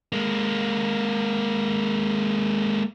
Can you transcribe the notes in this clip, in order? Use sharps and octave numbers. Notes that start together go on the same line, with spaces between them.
G#3 A#3